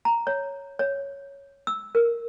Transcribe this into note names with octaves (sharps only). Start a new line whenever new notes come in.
A#5
C#5
C#5
E6
A#4